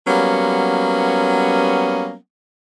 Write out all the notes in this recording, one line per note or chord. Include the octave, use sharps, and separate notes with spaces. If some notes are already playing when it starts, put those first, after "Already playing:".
F#3 G3 A#3 B3 C#4